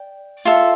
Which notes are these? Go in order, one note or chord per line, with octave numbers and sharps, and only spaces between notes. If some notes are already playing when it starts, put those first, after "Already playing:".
Already playing: D5 G5
F4 A4 E5